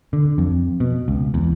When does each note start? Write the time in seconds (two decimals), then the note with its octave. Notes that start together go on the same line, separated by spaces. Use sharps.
0.13 D3
0.38 F2
0.80 B2
1.08 C#2
1.34 E2